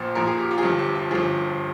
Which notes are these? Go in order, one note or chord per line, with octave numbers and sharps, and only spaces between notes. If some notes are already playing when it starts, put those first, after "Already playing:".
Already playing: A#1 A#2 F3 C5
A#1 A#2 F3 A#4
G#4
G4
F4
G#4
G1 G2 F3 G4
G4
F4
G1 G2 F3 G#4